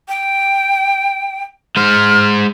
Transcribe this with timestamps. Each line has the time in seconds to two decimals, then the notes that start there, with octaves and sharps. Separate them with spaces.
0.08 G5
1.76 G#3 C5 F6